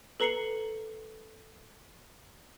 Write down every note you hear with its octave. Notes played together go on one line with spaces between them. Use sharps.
A4 B4 A#5 C7 C#7 F#7